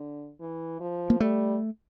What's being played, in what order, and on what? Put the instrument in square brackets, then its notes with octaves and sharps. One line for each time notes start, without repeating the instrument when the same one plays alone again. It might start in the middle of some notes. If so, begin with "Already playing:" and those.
Already playing: [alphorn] D3
E3
F3
[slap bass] A#3
[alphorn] G3 [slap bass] A3